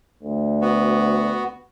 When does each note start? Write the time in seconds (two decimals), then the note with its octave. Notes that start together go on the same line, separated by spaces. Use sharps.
0.23 D2
0.62 B3 F#4